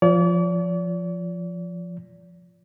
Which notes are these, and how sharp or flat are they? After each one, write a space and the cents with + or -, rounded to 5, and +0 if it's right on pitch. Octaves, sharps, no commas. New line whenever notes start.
F3 +0 D5 -40